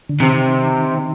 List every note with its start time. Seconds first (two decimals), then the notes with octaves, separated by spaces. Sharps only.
0.09 D3
0.20 C3 D#3